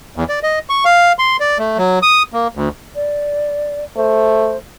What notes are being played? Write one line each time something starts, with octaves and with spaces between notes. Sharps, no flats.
E2
D5
D#5
C#6
F5
C6
D5
A3
F#3
D#6
A#3
D2
D5
A3 C5